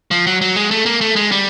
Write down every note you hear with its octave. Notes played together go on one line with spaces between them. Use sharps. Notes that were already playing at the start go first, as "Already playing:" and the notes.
F3
F#3
F#3
G#3
A3
A#3
A3
G#3
G3